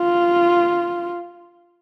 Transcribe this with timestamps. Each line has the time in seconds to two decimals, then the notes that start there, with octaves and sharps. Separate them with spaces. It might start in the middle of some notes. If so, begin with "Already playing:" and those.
Already playing: F4